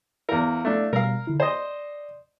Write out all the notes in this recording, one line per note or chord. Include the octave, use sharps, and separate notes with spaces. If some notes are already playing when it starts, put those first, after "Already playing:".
E2 E4 A#4 F5
A3 D4
B2 G3 A#4 F5
D3 E4
C5 D5 D#5